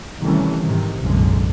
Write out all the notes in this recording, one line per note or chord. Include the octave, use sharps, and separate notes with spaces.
C3 D#3 E3 G3 A3 C#4
G#2 C3 D#3
B1 F#2 A2 D3 G#3